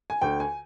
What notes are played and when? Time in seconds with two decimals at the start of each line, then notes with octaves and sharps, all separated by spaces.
0.10 G#5
0.22 D2 D3 G5
0.40 G#5